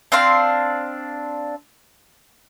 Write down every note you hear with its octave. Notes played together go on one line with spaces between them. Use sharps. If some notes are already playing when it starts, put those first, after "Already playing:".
C4 D4 C5 F5